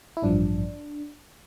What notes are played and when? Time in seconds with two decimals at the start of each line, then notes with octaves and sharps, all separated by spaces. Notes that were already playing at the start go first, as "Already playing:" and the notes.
0.17 E4
0.22 A1 G2 F3 D4